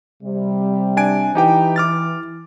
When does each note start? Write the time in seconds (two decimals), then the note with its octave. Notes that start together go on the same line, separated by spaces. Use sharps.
0.23 C3 G3
0.97 D4 G#5 D7
1.35 E3 D#4 G4 G5
1.76 D6 F6 A6